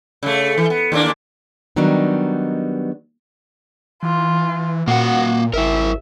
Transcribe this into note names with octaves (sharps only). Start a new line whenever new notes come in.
C#3 A3
E3
B3
D#2 A#3 D4
D#3 F#3 G3 B3 D4 D#4
E3 F4
A#2 A#3 F#4 F5 F#5
G#1 E4 A#4 E5